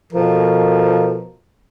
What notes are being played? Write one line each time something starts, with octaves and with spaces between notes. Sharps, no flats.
B2 F3 A4 A#4